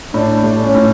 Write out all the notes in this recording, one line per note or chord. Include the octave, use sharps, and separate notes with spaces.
A2 D4
A3
C#4
A2